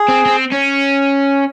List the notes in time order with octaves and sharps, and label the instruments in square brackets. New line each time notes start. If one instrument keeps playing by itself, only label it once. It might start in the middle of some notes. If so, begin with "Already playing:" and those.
Already playing: [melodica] G#4
[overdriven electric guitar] C4
C4
C#4